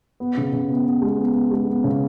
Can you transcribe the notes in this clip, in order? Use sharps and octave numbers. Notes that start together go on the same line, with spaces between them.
B3
C#3
C#3
B3
B3
G#3
B3
B3
G#3
B3
C#3